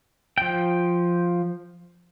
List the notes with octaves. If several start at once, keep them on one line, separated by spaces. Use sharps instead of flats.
F3 G5